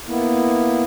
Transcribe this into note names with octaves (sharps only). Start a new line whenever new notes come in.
A#3 B3 E4